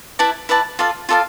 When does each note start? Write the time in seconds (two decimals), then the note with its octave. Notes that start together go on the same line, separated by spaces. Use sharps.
0.19 E4 B4 D5 A5
0.49 E4 B4 D5 A5
0.79 F4 A4 D5 F5
1.09 F4 A4 D5 F5